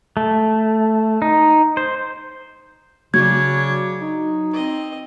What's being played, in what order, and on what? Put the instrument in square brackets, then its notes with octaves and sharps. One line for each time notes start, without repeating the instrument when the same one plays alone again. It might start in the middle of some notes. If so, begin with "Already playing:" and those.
[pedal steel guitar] A3
D#4
C5
[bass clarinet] C#3 [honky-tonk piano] F#3 [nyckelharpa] D4 C#5 [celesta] G#6
[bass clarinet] D#4
[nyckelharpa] C4 D#5